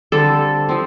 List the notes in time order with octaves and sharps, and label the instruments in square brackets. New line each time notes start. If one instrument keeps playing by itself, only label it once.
[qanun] D3 G3 C4 A4
F3 C4